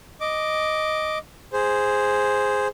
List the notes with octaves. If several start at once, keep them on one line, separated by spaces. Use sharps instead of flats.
D#5 D6
G#4 C5